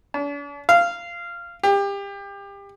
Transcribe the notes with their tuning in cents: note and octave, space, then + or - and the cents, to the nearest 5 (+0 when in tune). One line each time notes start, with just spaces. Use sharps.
D4 -45
F5 -15
G4 +30